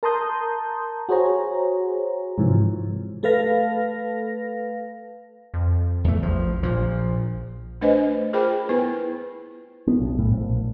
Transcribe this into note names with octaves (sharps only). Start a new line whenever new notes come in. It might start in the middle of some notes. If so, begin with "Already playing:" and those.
A#4 A5 A#5 C6 D#6 G6
F#4 G#4 C5 C#5 A#5
G#2 C3 E3 F3
A3 A4 B4 F5 A#6
F2
E2 A3
A1 F3
A#1 A#2 F3
A3 D4 B4 C5 D#5 G#5
F4 G#4 A#4 C5 G5 B5
B3 E4 B4
B3
B1
A2
A#1